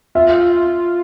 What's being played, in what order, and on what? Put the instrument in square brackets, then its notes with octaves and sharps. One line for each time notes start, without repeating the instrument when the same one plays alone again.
[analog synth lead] F4 [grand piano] E5